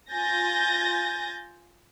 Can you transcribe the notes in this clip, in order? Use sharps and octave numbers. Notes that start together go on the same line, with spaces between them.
F4 G#5 G6 A6 A#6